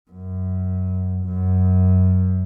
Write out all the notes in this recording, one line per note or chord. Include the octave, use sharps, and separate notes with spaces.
F#2
F#2